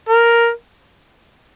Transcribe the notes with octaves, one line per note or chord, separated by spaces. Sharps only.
A#4